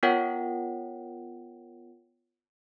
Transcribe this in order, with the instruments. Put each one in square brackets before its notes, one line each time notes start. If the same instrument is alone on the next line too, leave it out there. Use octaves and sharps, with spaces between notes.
[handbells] B3 F4 A#4 C#5 F#5 G5